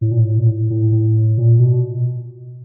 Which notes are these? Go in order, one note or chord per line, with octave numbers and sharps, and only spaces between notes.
A2
A#2
A2
A#2
A2
A2
A2
A#2
B2